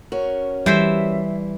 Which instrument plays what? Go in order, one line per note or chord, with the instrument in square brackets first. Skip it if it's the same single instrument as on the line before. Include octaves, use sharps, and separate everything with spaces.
[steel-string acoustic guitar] C#4 F#4 A#4
[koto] E3 C5 E5 [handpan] G3